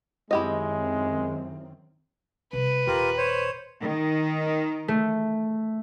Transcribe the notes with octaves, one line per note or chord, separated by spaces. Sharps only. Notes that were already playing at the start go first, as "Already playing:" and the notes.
F#2 D#3 G#3 C4 E4 G4 D#5
C3 G3 B4
D#1 F4 G4 A#4
C5 C#5
D#3
A3